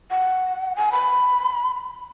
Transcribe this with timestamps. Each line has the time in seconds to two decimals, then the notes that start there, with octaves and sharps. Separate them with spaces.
0.10 F#5
0.76 G#5
0.92 B5